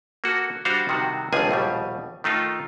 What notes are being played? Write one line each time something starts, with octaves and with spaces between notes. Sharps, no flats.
A#3 F#4 A4
G3 D4 F#4 C5 F5
C3 D#3 G3 F#4
G1 C#2 C3 F3 G#4 G#5
A#1 D#2 B2 G3
D#3 A3 D#4 F4